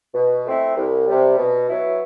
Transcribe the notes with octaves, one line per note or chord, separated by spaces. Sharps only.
B2
A3 C4 E4
C2
C3 G3
B2
F#3 B3 E4